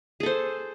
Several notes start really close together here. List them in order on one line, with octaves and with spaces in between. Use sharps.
G#4 A4 C5